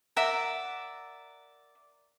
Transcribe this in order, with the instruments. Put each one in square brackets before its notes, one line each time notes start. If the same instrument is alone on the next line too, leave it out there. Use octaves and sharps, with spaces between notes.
[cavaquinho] A#4 D5 E5 F#5